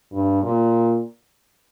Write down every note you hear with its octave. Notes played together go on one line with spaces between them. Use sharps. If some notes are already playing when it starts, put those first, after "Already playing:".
G2
A#2